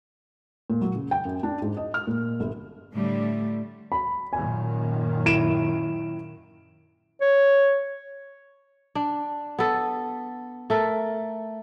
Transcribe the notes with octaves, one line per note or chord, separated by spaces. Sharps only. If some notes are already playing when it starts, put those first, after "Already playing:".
A#2
F#3
C#3
G5
F#2
D4
G#2
D#5
F6
A#2
G1
A2 D3 G3 A3
B5
F#2 A#2 D#3 G#5
E4 D7 E7
C#5
D4
B3 A4
A3 A4 A#4